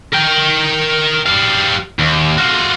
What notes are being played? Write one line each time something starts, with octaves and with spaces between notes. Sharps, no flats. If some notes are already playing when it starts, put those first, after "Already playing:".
A#4 G5
G3 F5
D#2
F4 F#4